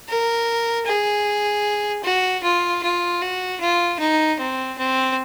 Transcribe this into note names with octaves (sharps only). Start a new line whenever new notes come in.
A#4
G#4
F#4
F4
F4
F#4
F4
D#4
C4
C4